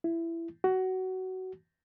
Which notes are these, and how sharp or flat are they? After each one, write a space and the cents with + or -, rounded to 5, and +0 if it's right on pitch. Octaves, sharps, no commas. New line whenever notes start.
E4 +15
F#4 +15